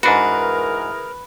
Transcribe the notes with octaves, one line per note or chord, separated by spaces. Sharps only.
G#2 E3 D4 F#4 G#4 A#4 B4